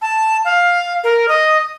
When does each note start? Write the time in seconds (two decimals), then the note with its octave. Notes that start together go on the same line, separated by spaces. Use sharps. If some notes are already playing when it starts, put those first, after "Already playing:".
0.02 A5
0.45 F5
1.04 A#4
1.29 D#5